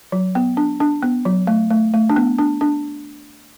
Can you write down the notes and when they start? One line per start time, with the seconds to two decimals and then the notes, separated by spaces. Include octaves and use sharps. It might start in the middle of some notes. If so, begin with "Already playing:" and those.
0.12 F#3
0.35 B3
0.57 D4
0.80 D4
1.03 B3
1.25 F#3
1.47 A3
1.70 A3
1.94 A3
2.10 D4
2.16 B3
2.38 D4
2.61 D4